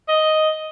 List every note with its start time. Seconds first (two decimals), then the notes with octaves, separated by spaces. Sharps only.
0.08 D#5